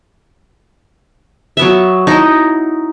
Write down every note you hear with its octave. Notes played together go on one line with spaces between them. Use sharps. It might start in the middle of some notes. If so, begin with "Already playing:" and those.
F#3 B3 E5
D#4 E4